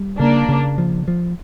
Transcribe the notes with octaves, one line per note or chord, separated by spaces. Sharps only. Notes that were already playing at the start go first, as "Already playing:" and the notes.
Already playing: G3
C#3 A#3 D4
C#3
F3
F3